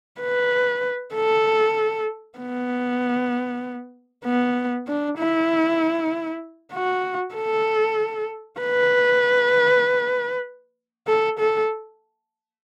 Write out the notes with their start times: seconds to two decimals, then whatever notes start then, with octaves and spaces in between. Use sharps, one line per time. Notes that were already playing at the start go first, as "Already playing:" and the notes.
0.21 B4
1.14 A4
2.39 B3
4.25 B3
4.87 D4
5.18 E4
6.73 F#4
7.35 A4
8.60 B4
11.08 A4
11.39 A4